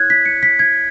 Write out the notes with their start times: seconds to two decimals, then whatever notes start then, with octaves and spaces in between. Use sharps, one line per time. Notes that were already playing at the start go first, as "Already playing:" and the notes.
Already playing: E4 C#5 F#6 G#6
0.10 B6
0.25 C#7
0.43 B6
0.59 G#6